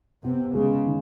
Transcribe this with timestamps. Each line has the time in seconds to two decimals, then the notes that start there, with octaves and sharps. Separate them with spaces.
0.24 C3 B3
0.54 C#3 G#3
0.85 D#3